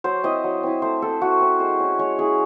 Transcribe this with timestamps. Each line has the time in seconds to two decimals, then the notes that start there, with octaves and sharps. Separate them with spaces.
0.04 F#3 C5
0.23 C4 E4 D#5
0.44 F#3
0.63 C4 E4
0.82 A3 C5
1.02 C4 E4 A4
1.21 A3 F#4
1.40 C4 E4
1.60 G#3 C5
1.80 C#4 E4
1.99 G#3 C#5
2.19 C#4 E4 G#4